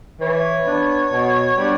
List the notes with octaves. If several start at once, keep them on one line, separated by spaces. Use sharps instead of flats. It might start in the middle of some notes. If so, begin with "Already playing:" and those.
E3 C#5
B3 D4
B2
G3 B3 D4